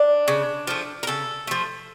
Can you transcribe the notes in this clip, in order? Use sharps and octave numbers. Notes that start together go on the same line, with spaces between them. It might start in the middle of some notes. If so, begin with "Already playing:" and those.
Already playing: D4
C#3
F3 A3
A#4
C#3 A4
F3 A3